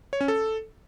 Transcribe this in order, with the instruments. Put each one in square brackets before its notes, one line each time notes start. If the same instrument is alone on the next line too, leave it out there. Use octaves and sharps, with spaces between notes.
[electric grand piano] C#5
C#4
A4